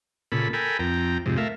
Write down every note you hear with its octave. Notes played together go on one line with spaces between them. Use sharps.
A#2 C#3 A4 B5
A4 A#4 G5 G#5 B5
F2 G5 A#5
F2 G#2 C3
A3 A#4 E5 F5